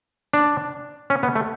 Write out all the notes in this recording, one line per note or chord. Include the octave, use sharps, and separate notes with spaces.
D4
C#4
B3
A3